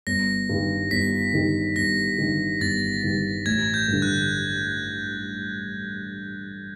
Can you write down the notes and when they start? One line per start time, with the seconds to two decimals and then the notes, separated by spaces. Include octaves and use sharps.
0.07 G1 A#6
0.49 G2 D#3 G3
0.91 G1 B6
1.34 G2 D#3 G3
1.76 G1 A#6
2.18 G2 D#3 G3
2.61 G1 A6
3.03 G2 D#3 G3
3.46 A1 G#6
3.74 G6
3.88 G2 D3
4.02 F#6